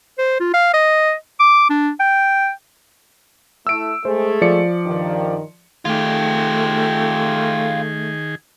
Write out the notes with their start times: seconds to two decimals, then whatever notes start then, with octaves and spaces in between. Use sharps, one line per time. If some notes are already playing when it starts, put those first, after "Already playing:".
0.18 C5
0.40 F4
0.54 F5
0.74 D#5
1.40 D6
1.70 D4
2.00 G5
3.67 A3 E4 E6 D7
4.05 G#3 A3 G#4 C5
4.41 F3 D5 C#7
4.86 G2 D#3
5.85 D#3 A3 F4 G4 G#4